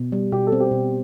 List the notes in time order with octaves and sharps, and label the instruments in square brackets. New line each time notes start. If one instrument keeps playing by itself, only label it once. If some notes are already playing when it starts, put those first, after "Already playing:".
Already playing: [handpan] B2
G3
[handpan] B2 [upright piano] G4
[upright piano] A4
[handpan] C4
[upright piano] G4
[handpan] B2